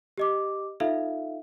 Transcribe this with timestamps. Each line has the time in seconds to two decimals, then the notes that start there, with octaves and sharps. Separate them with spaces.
0.18 G4 D#5 D6
0.80 D#4 F4 A4 E5 F5